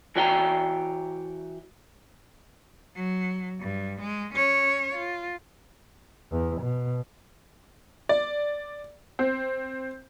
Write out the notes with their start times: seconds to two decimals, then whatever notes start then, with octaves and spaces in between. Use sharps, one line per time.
0.16 E3 F#4 D5 G5 A5 A#5
2.96 F#3
3.60 G2
4.01 G#3
4.34 C#4 C#5
4.95 F4
6.31 E2
6.62 B2
8.09 D5
9.19 C4